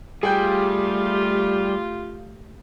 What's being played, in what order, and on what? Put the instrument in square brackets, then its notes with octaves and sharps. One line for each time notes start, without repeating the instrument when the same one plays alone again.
[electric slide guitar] G3 [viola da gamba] A3 G4 [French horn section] F4 [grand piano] G#4 G5 G6